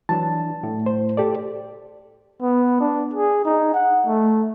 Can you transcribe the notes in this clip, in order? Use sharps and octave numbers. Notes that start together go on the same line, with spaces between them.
E3 F#3 D4 A5
A2
C5
G4 A4 D5
B3
D4
G#4
D#4
F#5
A3